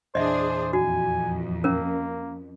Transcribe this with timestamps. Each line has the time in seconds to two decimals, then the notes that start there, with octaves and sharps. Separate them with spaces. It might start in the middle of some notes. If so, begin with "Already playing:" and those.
0.15 E2 A#2 E3 D4 G#4 C5 D#5 E5
0.73 F2 F#4 G#5
1.64 A#3 C#4 A#4